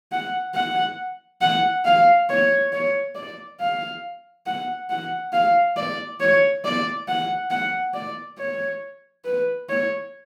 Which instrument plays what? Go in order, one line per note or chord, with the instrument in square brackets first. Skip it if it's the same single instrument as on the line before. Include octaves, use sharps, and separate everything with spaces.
[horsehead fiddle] F#5
F#5
F#5
F5
C#5
C#5
D5
F5
F#5
F#5
F5
D5
C#5
D5
F#5
F#5
D5
C#5
B4
C#5